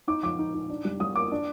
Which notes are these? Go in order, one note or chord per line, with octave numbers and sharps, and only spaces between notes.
D#4 D6
F3 D6
D#4
D#4
D4
G3
G3 D#6
A#3 D6
D4